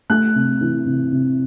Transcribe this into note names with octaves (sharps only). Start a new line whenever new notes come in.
A3 F#6
C3
E3
C3
C3